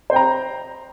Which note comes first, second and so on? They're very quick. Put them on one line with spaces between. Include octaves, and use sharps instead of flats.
C5 G5 A#5